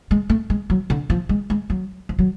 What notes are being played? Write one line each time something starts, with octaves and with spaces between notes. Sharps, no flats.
G#3
A3
G#3
F#3
D3
F3
G#3
G#3
F#3
F3
F#3